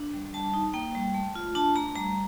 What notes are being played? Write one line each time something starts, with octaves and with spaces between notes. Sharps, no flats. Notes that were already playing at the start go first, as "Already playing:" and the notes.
Already playing: D4
G3
G3 A5
D#4
A#3 G5
G3
A3
F4
D4 A5
A3 A#5
G3 A#5